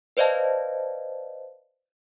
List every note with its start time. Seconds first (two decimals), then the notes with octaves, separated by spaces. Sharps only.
0.17 B4 C5 D5 D#5 F5 A5